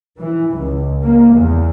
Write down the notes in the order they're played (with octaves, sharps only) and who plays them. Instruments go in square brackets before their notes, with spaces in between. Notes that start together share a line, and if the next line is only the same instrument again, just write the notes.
[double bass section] E3
C#2
A#3
E2